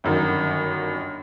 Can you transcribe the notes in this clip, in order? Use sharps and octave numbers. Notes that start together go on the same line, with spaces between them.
G1 F#2 D#3